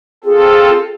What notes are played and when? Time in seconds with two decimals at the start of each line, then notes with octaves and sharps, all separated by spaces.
0.24 C4 F4 G#4 A4